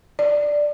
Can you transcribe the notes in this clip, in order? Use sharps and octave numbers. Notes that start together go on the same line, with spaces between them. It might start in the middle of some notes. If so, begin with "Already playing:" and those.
D5